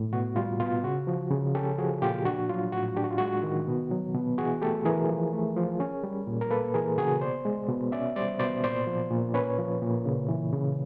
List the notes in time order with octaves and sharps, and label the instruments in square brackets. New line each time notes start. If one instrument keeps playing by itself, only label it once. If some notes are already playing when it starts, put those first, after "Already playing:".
Already playing: [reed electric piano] A2
B2 F#4
G3 F4
B2 F4
C#3 F#4
F3
C#3
C#4 G4 A4
F3 F#4 G#4
A#2 F4 G4
D4 F#4
F#3 F4
A2 F#4
D4 G4
F#4
F4
G#3 F#4
D#3
B2
F#3
B2
E3 F#4 G#4
A3 G4 A4
E3 G#4 A#4
F3
A3
F3
C#4
G3
A#2
A#4
A#3 A4 B4
E3 G#4 A#4
C#3 F#4 G#4
B2 C5 D5
G#3
B2
C#4 D5 E5
G3 C5 D5
B2 C5 D5
A#2 C5 D5
F3
A#2
C#4 B4 C#5
F3
A#2
C#3
E3
C#3